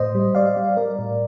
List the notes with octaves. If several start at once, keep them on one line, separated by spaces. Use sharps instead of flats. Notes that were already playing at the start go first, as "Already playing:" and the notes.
Already playing: A2 C5 D#5
G3
G3 D5 F5
G3
G3 A#4 D5
A2